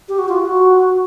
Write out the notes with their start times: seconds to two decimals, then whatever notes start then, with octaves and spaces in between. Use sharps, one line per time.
0.09 G4
0.19 F#4
0.29 F4
0.39 F#4